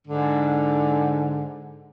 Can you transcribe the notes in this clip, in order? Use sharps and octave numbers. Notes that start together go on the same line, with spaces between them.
G#2 D3